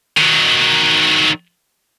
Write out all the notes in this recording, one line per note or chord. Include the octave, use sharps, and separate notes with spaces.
D#3 F#3